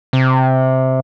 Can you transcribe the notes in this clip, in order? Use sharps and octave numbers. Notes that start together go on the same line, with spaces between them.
C3